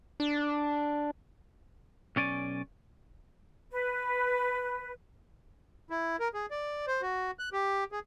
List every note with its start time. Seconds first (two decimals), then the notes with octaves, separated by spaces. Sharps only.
0.20 D4
2.16 B1 C#4 D5 G#5
3.72 B4
5.90 E4
6.19 A#4
6.34 G#4
6.51 D5
6.87 C5
7.02 F#4
7.39 F#6
7.53 G4
7.92 G#4